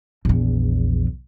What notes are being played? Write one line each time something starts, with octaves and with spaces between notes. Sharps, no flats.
A#1 E2